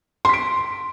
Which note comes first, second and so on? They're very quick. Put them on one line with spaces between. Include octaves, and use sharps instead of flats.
C6 B6 D7